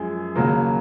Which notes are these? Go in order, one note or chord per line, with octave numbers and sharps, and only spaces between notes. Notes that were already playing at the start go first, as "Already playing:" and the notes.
Already playing: F#2 F3 G#3 G#4
D#2 C#3 F#3 A#3